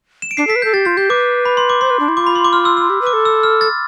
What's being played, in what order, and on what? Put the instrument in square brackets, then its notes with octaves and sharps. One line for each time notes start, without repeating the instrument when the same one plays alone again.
[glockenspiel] E7
D7
[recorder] D4 [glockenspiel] C7
[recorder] A4 [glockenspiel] B6
[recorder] B4
[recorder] A4 [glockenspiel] G6
[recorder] G4 [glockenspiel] A6
[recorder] F4 [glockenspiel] G6
[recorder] G4 [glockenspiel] G6
[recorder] B4 [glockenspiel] D6
[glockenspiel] B5
C6
D6
[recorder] C5 [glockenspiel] C6
[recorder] B4
D4
E4
[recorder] F4 [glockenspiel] D6
[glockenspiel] B5
C6
D6
F6
E6
E6
[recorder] G4
B4
[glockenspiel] D6
[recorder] A4
[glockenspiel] E6
F6
A6